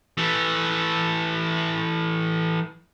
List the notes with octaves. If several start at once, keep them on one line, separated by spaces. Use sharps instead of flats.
E3 A3